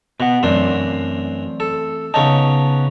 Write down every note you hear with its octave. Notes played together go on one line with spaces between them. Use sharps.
B2 B4 F#5
F#2 E3 A3 C4 D4
A4
C#3 B3 C#4 D#4 A5